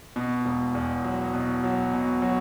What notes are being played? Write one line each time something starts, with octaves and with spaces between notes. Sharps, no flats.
B2
E1
E2
F#3
B2
F#3
B2
F#3